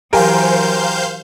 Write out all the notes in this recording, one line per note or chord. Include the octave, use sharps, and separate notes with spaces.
E3 F#3 G4 A#4 C5 F5 G#5 G6